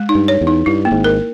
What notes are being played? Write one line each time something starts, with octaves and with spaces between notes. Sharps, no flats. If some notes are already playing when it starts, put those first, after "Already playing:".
Already playing: G#3
D#4
G2
C#5
E2
D#4
G2 E4
A#3
G#1 G#2
A#4